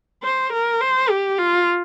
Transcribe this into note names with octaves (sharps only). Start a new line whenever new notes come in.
C5
A#4
C5
G4
F4